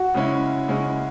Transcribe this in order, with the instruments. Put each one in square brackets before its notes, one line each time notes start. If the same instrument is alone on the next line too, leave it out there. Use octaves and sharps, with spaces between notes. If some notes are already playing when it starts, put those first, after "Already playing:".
Already playing: [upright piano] F#4
[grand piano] C#3 G#3 C#4 E4
C#3 G#3 C#4 E4